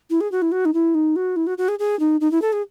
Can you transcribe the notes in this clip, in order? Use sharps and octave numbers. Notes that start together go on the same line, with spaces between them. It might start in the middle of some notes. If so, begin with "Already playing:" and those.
E4
G#4
F#4
E4
F#4
D#4
E4
D#4
F#4
E4
F#4
F#4
G#4
G#4
D#4
D#4
E4
A4
G#4